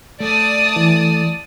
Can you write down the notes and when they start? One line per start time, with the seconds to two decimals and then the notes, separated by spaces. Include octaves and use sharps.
0.20 A3 D5 A5 D#6
0.76 E3